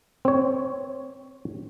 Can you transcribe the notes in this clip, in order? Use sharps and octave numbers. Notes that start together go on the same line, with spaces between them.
C4 C#5